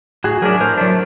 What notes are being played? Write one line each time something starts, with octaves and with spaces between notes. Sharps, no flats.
A2 F#4 G#4
F#3 A3 D4 G#4 A#4
A2 A#4 C5
F#3 A3 D4